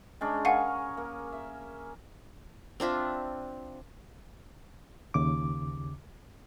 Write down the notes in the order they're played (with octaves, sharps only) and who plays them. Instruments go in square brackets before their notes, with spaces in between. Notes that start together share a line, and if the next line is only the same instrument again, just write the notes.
[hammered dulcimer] G#3 C#4 D4
[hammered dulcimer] G#4 A#4 C#6 [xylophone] F5 F#5 G#5
[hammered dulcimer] A#3
E5
[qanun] C4 D4 F4 E5
[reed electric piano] D#2 C#3 D6